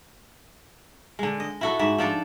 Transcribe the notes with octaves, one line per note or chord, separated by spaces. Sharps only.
D3 G#3
D#5
E4 F#4 A4
G#2 F#4 E5
F3 D4 A4 D5